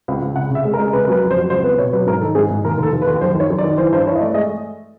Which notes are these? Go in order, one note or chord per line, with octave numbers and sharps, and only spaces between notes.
C#2
C#2
C#3 F#5
C#3 E5
G#3
A#4
G#3
C#3 B4
A#4
F#3 B4
F2
C5
F#3
C#2 C5
B3 B4
B2 C#5
F#3 B4
G#2 A#4
D#3 A4
G#2 G#4
G#2
D#2 A#4
D#2
A4
D#2
B4
D#2
F#2 C5
D#3
C#5
F#2
D5
D#3
E3 C5
G2 C5
E3 C#5
D#5
A3 D5
G#3 D#5